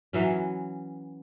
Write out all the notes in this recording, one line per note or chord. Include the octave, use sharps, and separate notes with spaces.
E3 F#3 C#4